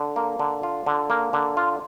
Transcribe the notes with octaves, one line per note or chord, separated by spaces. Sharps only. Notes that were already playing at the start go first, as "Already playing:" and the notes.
Already playing: D3
A#3
D3
F4
D3
A#3
D3
F4